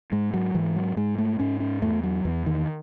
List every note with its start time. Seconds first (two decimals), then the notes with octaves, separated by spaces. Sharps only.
0.12 G#2 G#3
0.34 F#3
0.55 G#2 E3
0.76 F#3
0.96 G#2 G#3
1.18 A3
1.39 G#2 C#4
1.60 C#4
1.82 E2 A3
2.03 F#3
2.25 E2 E3
2.46 D#3